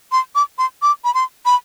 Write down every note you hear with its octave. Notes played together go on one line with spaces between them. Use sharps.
C6
D6
C6
D6
B5
C6
B5